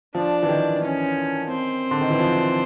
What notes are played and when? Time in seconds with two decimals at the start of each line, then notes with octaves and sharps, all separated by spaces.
0.15 F3 D4
0.43 E3
0.49 D#3
0.84 C#4
1.51 C4
1.91 D3
2.01 D#3
2.10 E3
2.20 F3